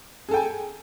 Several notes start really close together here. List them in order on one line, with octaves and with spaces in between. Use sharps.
G#4 A4 G5 G#5